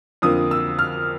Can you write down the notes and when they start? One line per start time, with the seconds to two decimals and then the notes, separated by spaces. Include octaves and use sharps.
0.22 F2 D3 F3 A#3 D#6
0.51 E6
0.79 F6